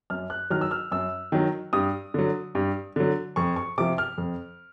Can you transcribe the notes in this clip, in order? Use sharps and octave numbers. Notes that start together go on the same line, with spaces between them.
F#2 F6
F#6
D#3 F#3 F6
E6
F6
F#2 E6
D#3 F#3
G2 D#6
D3 F#3
G2
D3 F#3
F2 C#6
C#6
C3 F3 D6
F6
F2